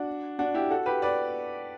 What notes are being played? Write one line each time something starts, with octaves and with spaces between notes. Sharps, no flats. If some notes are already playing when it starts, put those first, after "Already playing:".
Already playing: D4 F#4
D4 F#4
E4 G4
F#4 A4
G4 B4
B4 D5